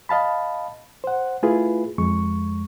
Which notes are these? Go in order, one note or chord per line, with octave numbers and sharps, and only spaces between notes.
D#5 F5 A5 B5
C5 F#5
A3 E4 F4 G#4 B4
F2 G#3 C#6